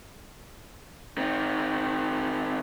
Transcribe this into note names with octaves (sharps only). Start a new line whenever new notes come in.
D#3 C4